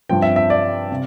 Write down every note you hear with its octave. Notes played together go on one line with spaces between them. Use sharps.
G2 F3 C4 G5
E5
E5
D5
C3